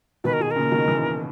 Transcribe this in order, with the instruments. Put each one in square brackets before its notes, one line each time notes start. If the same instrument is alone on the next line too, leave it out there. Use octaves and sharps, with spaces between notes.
[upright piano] B2 D#3 [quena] B4
[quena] A#4
[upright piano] B2 [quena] G#4
[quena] A#4
[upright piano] A#2 C#3
B2 D#3
C#3 E3